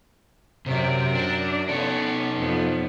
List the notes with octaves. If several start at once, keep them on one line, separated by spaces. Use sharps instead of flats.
F#2 C3 A#4 D5
D4
B3 C#4 D#4 A4 C#5
F2 B3